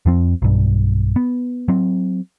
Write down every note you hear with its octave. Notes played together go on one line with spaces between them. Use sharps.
F2 F3 C4
B1 G2
B3
F#3 C4